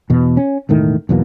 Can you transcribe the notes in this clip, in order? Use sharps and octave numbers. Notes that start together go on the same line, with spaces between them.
E2 B2
C#4
E1 A2 D#3 A3
B1 E2 B2 A#3